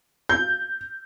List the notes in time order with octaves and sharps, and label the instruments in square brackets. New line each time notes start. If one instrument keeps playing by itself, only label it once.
[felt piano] G6